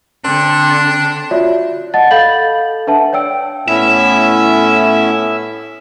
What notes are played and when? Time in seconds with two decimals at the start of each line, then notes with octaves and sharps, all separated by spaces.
0.24 D3 C4 D4
1.31 F4 F#4 C#5 D5 E5
1.94 D#5 F#5 A5 A6
2.11 A4 F5 B5 G6 A6 F#7
2.87 D4 B4 E5 F#5 A5
3.13 C#5 D5 G5 E6 D7
3.68 A2 B3 C#4 E4 E5